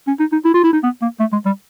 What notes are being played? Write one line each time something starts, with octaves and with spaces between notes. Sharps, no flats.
C#4
D#4
D#4
E4
F4
E4
D#4
B3
A#3
A3
G#3
G3